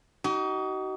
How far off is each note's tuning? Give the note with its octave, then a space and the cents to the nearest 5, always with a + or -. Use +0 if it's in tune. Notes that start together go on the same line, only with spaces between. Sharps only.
D#4 +5 F#4 +40